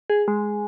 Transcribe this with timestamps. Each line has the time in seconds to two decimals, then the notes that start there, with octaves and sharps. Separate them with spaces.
0.10 G#4
0.28 G#3